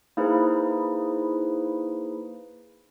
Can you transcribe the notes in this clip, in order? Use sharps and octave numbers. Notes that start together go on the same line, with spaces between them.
A#3 D#4 E4 G#4 B4 C5